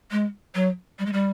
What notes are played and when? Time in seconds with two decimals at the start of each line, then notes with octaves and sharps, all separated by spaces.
0.11 G#3
0.55 F#3
0.99 G3
1.06 G#3
1.13 G3